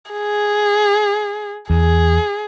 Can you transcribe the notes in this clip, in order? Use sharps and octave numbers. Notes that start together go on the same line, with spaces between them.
G#4
E2 G#4